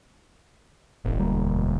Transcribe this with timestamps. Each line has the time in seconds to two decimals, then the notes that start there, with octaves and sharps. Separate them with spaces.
1.05 E1 A1
1.20 D2 G3 A#3